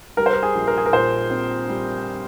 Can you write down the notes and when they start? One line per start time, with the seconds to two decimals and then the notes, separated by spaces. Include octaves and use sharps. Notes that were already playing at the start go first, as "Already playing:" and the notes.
0.17 G3 A#4
0.26 C5
0.33 A#4
0.43 G#4
0.55 A#1
0.67 A#4
0.78 G#4
0.86 A#4
0.92 A#2 C5
1.30 C4
1.69 G3